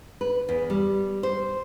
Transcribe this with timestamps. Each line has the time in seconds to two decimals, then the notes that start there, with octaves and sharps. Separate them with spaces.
0.21 B4
0.49 E2
0.70 G3
1.23 C5